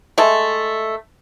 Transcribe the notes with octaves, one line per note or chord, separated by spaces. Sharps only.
G#3 A3